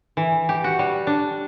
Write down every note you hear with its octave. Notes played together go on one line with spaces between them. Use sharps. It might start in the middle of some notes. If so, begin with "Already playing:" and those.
E3
G4
F#4
G3
D4